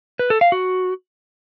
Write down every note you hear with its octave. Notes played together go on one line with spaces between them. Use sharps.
B4
A4
F5
F#4